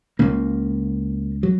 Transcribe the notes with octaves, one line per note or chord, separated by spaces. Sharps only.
C#2 C#3 A#3
F#3